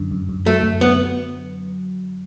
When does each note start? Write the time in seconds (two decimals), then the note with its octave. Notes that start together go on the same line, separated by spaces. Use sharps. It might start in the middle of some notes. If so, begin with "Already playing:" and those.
Already playing: F#2 D3
0.11 F#2
0.29 F#2
0.46 F#3 A3
0.63 F#2
0.80 F#2 B3